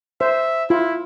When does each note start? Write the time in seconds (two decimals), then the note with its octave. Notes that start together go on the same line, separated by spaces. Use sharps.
0.21 C5 E5
0.70 E4 F4